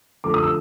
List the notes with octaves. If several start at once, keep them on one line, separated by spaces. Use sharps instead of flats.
D3 F3 A3 D6
D#6
E6